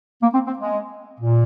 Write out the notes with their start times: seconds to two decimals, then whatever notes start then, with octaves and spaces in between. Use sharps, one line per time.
0.22 A#3
0.34 C4
0.46 C4
0.59 G#3
1.20 A#2